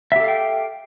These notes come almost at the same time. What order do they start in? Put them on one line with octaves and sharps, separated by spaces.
E5 G4 A4 F5 G5